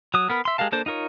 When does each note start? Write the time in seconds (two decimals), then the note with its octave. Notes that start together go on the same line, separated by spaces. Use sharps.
0.14 F#3 D#6
0.30 B3 A#4 B4
0.45 E5 C6
0.58 G#3 G4 A#4 F5 A5
0.72 A#3 D4 A4 C5
0.86 D#4 F4 A#4 C#5